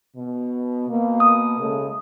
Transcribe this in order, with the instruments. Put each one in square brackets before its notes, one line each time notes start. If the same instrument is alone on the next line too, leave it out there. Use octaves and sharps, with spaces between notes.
[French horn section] B2
B2 A#3
[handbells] D#6
[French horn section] C#3 G#3 A3